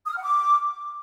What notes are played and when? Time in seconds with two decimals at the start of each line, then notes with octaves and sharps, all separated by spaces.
0.06 D#6
0.12 F6
0.17 F#5
0.23 D6